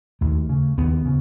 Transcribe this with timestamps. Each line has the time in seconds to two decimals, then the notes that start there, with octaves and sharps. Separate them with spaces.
0.21 D#2 A3
0.49 C#3
0.78 D#2 B3
1.06 C#3